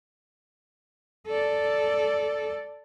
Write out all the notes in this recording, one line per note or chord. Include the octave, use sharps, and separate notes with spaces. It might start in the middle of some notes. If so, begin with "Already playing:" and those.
A4 D5